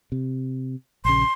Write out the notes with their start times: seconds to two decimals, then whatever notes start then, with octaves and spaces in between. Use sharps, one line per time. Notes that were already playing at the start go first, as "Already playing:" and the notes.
0.12 C3
1.05 A#1 C#3 C6